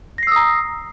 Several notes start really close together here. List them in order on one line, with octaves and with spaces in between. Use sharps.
A#6 C7 E6 D#6 A#5